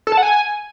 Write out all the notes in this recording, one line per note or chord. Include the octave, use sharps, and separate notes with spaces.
A4
A5
F#5
G#5